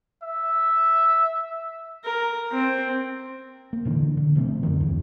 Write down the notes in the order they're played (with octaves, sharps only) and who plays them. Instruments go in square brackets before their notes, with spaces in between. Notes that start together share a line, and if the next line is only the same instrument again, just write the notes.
[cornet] E5
[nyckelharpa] A#4
C4
[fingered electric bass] A#3
A#2 D3 E3
D3
B2 F3 A3 C4
F#2 D3 D#3
D#2 E3